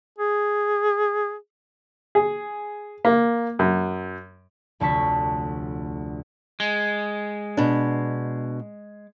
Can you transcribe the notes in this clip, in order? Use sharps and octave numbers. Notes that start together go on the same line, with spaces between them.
G#4
G#4
A#3
F#2
F1 D2 A5 C#6 B6
G#3
B2 D4